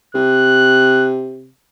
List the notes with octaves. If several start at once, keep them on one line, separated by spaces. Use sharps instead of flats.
C3 F#6